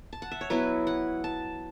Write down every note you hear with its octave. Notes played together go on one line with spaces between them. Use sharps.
A5
F#5
E5
C#5
F#3 B3 E4 B4
F#5
A5